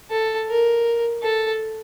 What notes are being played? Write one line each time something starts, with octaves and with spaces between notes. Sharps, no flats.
A4
A#4
A4